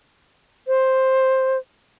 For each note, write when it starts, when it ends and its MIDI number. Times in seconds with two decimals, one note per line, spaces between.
0.68 1.57 72